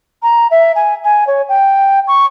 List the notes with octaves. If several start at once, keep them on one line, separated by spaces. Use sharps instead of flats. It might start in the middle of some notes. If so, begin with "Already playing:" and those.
A#5
E5
G#5
G#5
C#5
G5
C#6